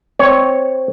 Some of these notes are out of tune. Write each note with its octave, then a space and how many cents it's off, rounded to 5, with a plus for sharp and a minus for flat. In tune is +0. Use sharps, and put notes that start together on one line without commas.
C4 +0 C#5 +0